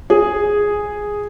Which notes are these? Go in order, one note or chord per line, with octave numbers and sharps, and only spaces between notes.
G#4